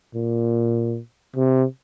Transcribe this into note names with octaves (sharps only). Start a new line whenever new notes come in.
A#2
C3